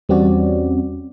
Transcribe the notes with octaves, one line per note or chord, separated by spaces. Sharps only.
E2 G3 C4 C#4 F#4 D5